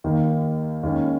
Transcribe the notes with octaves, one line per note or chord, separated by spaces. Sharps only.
D#2 D#3 A#3 D#4
D#2 D#3 G#3 C#4